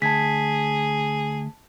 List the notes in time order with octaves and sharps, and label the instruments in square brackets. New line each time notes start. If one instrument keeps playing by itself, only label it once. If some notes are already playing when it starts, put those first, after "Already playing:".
[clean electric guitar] D2 [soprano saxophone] G#4 [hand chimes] A5 G#6 B6